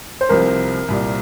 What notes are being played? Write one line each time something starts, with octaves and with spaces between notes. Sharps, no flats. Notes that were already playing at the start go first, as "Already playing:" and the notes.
C5
C2 C3 F3 A#4
C2 A#2 G3